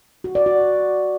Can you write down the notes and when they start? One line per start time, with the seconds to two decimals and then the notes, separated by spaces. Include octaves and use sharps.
0.24 F#4
0.35 D5
0.46 F#4